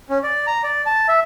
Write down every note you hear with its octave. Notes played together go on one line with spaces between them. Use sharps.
C#4
D5
A#5
D5
A5
E5